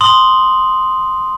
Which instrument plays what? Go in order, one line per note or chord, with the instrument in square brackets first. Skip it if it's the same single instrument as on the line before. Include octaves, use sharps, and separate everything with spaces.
[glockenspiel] C6 D#6 F#7